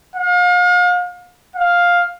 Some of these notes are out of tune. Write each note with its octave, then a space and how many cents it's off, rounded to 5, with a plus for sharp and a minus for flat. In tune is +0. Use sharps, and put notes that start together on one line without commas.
F5 +40
F5 +5